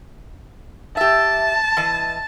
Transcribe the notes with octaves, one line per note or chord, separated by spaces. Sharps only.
G4 E5 A5
E3 D#5